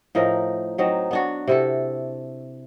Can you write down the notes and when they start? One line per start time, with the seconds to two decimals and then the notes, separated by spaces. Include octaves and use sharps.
0.15 A2 F3 D#4 A#4
0.78 F#3 C4 D#4
1.11 B3 D4 F#4
1.48 C3 E4 A4